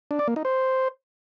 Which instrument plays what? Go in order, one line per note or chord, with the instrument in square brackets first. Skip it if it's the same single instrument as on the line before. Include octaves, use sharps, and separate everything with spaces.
[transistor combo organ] D4
D5
A#3
D#4
C5